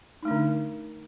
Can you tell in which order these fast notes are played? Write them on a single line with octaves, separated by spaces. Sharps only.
D#4 A3 D4 D3